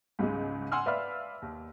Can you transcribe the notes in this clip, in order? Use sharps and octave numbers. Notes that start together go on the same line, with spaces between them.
C#2 G#2 C#3 G#3
F#5 G#5 C6 E6 F6
B4 D5 E5 F5 B5 F6
D#2